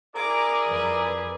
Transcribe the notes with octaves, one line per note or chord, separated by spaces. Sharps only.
E4 G#4 A#4 D5 A#5 D6
F2 B4